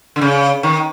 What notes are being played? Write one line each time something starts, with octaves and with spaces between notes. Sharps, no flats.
D3
C#3
D#3